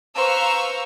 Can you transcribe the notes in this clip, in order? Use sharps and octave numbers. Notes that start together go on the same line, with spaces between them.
B4 C5 F5 A#5 C#6 E6